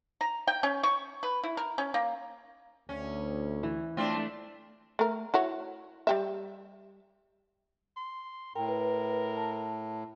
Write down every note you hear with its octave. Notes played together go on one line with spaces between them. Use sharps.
A#5
G5
C#4
C#6
B4
E4
A#4
C#4
A#3
D2 C#4
E3
A3 C4 D4 F4
A3 A#4
E4 F#4 C#5
G3 G4 E5
C6
A2 A#4 G5
B4
A5